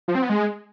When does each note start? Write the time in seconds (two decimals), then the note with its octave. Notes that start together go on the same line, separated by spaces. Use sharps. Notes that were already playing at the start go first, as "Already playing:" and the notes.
0.08 F3
0.15 C4
0.22 B3
0.30 G#3